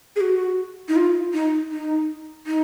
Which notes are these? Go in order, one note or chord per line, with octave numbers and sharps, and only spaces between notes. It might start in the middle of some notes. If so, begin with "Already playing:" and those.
G#4
F#4
D#4
F4
D#4
D#4
D#4